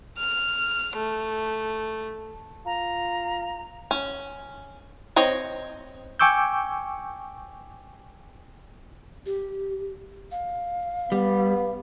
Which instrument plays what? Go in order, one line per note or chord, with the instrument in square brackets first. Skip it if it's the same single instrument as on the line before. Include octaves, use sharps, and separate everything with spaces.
[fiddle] F6
A3
[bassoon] F4 [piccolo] A#5
[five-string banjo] C#4
C4 C#5 D#5
[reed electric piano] G5 G#5 C#6 D6 E6 G6
[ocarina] G4
F5
[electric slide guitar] G3 [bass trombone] B3